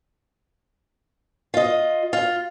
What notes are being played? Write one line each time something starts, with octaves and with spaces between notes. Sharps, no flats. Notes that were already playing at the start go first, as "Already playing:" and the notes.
F4 D#5
F4